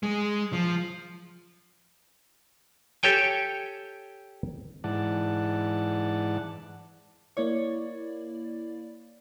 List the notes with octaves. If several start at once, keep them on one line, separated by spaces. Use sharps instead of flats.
G#3
F3
G4 A4 C#5 G5 G#5
G#2 E3 D5 F#5 A5
A#3 E4 C#5 D5